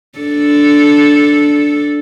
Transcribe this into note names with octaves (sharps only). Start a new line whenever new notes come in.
D4 A4